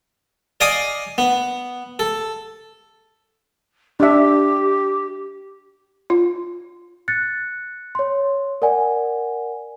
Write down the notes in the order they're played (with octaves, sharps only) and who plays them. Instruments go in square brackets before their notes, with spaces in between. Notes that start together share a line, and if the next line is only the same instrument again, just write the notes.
[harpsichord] D5 D#5 F5 G#5 D6 D#6
B3
A4
[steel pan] D4 E5 [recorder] G4
[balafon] F4
[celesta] F#6 A6 C#7
C#5 C6
A#4 D5 F#5 G#5